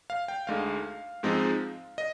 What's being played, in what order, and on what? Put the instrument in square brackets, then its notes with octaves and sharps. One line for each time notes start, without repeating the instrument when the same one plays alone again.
[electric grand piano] F5
G5
D2 D3 G#3 D#4 F5
G#2 F3 G#3 C4 D#4
D#5